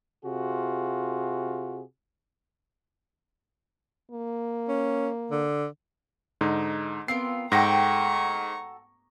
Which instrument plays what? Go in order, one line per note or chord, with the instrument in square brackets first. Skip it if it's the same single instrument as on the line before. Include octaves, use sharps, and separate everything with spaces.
[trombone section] C3 F4 F#4 G#4
[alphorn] A#3
[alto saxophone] C#4
D3
[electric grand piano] G#2 D3 D#4
[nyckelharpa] B3 [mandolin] C4 F4 A#4 [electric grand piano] C7
[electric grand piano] G#2 A#6 [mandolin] F#4 A4 G5 [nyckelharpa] A#5 C#6